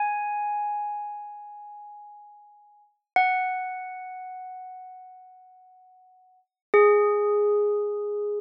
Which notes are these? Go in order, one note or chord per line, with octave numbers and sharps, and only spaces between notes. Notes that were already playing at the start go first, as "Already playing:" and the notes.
Already playing: G#5
F#5
G#4